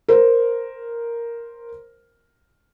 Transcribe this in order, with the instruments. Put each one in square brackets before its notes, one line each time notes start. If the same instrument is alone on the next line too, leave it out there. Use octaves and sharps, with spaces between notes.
[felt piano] A#4 C5